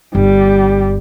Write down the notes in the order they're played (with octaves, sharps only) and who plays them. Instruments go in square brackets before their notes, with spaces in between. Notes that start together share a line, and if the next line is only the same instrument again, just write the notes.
[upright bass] G1 [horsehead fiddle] G3